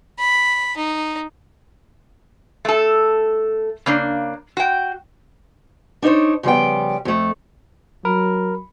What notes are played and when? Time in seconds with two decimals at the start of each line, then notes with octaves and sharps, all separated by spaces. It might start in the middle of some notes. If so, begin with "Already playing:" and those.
0.19 B5
0.76 D#4
2.65 A3 A4
3.86 C#3 A#3 D4
4.57 F#4 G5
6.02 D4 D#4 A#4 C5 C#5
6.43 C#3 F3 G3 B3 G5
7.05 F2 A3
8.05 F#3 A#4 B5